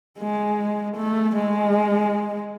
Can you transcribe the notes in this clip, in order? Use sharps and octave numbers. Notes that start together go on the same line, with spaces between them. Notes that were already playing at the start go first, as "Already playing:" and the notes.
G#3
A3
G#3